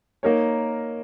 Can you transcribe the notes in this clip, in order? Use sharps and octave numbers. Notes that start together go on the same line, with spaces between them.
A#3 D#4 A#4 C#5